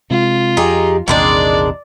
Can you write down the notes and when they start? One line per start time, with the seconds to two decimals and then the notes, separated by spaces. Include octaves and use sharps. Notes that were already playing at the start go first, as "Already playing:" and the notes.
0.11 C3 G#3 F4
0.57 F2 D#4 G4 G#4
1.08 A#1 E2 C3 D#3 G#3 D4 D5